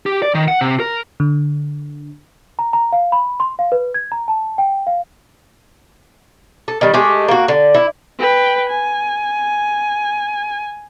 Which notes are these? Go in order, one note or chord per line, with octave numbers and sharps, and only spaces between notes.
G4
D5
D#3
F#5
C3
A#4
D3
A#5
A#5
F5
B5
C6
F5
B4
G#6
A#5
A5
G5
F5
A4
D#3 G3
G#3 A3 G4
A#3 F#4
D3
E4
B4 G5
G#5